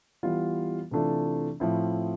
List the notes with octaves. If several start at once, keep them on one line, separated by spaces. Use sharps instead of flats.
E3 G3 B3 F4
C3 E3 A3 D4 F4
A2 F3 C4 E4